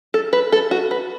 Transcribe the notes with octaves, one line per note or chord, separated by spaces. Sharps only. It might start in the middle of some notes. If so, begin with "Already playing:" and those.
A4
B4
A4
F#4
B4